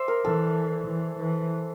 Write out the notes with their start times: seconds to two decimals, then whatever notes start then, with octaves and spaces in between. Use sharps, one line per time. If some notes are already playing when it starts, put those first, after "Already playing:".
Already playing: C5 D5 E5
0.08 A#4
0.24 E3 A4
0.87 E3
1.18 E3